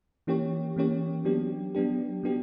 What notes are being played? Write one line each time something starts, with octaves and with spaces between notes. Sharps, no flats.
E3 A#3 C#4 G4 C#5
E3 A#3 C#4 G4 C#5
F#3 B3 D4 G4
F#3 B3 D4 G4
F#3 B3 D4 G4